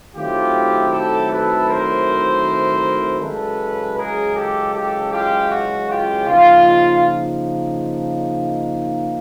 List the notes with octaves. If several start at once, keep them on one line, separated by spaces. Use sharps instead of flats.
D#3 F#3 A3 C4 E4 F4 G4
G4 A4
A4 B4
A#4 C5
F#2 C#3 E3 G#3 C#4 A4 B4
G#4 A#4
G4 A4
G4 A4
F4 G4
F#4
F4 G4
C#3 F3 A#3 D#4 F4